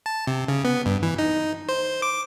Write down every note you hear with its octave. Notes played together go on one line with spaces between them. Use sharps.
A5
C3
C#3
B3
G2
E3
D#4
C5
D6